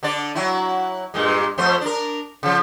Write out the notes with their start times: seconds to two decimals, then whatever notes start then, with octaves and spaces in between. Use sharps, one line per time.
0.03 D3 D4 D5
0.35 F#3 E4
1.14 G2 A#2 G#3
1.58 F2 A3 C5
1.81 D4 A#4
2.43 C#3 F3